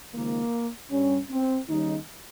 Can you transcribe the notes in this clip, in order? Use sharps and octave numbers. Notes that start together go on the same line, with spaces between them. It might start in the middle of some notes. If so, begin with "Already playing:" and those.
C#2 C3 D#3 A#3
G2 G3 C#4
C4
D#2 C#3 G3 D#4